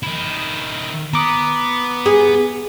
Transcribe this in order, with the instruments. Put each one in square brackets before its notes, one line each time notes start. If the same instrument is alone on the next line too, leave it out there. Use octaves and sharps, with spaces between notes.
[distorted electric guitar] D#3 E4
[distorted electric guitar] B3 [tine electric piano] A#5 D6 D#6
[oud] G#4